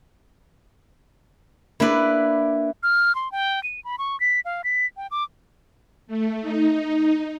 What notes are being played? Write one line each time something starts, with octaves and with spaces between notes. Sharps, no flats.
A#3 D4 E4 B4 D5
F6
C6
G5
D#7
B5
C#6
B6
F5
B6
G5
D6
A3
D#4